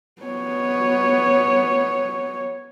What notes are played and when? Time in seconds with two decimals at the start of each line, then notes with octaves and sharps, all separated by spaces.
0.22 B3 C#5